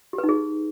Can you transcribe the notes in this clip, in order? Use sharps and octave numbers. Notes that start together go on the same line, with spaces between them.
G4
B4
D#4
G#4